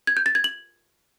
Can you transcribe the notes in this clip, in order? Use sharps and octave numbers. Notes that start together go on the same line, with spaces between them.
G#6
G6
A6
G#6
F#7